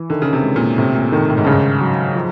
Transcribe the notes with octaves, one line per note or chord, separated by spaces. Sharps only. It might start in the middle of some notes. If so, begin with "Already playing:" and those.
Already playing: E3
D3 D#3
C#3
C3
G#3
A#2
A2 C3
A#2
A2 D#3
A2
G#2
G2 C#3
G#2
F#3
F3